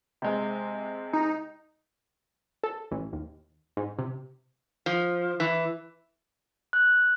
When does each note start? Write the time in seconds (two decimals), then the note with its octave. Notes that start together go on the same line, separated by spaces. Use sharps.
0.22 C3 G#3
1.13 D#4
2.63 A4
2.91 A1
3.13 D#2
3.77 G#2
3.99 C3
4.86 F3
5.40 E3
6.73 F#6